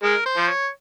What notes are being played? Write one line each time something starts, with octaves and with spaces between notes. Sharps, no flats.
G#3 A#4
C5
F3
C#5